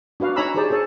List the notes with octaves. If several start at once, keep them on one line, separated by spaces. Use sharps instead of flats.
D4 F#4 B4 F5
D#4 C#5 G#5 A#5 B5 E6
D#4 G4 G#4 C5 D5 A5
G#4 A4 C#5 A5